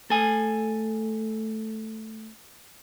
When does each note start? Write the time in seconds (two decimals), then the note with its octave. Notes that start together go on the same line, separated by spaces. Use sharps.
0.10 A3 A4 G#5